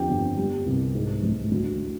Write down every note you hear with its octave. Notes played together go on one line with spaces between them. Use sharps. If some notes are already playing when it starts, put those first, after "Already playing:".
Already playing: F2 D3 G4 G5
G1
G3
C2
G#2
A1
D2